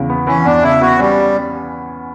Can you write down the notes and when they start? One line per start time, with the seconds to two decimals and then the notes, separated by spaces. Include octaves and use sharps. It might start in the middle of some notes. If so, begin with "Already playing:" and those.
Already playing: E2 C#3 E3
0.09 B3
0.27 E3 C#4
0.45 E2 D4
0.63 C#3 E4
0.81 B3 F#4
0.99 G3 C#4